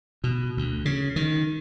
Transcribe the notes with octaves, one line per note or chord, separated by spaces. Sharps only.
B2
D2
C#3
D#3